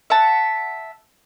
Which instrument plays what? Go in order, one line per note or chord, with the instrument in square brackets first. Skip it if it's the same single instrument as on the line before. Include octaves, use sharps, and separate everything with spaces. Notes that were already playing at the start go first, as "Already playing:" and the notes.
[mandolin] E5 F#5 A5